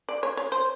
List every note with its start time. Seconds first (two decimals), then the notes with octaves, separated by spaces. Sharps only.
0.09 D5
0.23 C#5
0.37 C#5
0.52 C5